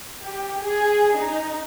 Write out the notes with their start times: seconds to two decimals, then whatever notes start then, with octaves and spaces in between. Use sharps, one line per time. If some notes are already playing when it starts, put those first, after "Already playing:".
0.23 G4
0.62 G#4
1.14 D#4